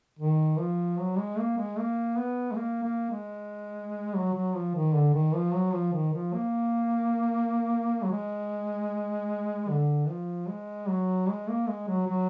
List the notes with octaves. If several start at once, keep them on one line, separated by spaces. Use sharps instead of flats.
D#3
F3
F#3
G#3
A#3
G#3
A#3
B3
G#3
A#3
A#3
G#3
F#3
F#3
F3
D#3
D3
D#3
F3
F#3
F3
D#3
F3
A#3
F#3
G#3
D3
F3
G#3
F#3
G#3
A#3
G#3
F#3
F#3